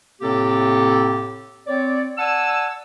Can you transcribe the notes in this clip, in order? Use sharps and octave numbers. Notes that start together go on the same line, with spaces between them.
A2 C3 A#3 C4 G4 A4
C4 C#5 D5
D5 F#5 G#5 A5 E6